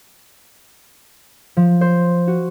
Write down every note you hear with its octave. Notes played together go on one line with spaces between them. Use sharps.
F3
C5
F#4